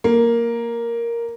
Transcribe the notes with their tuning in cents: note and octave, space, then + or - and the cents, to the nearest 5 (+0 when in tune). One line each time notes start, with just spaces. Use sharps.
A#3 +0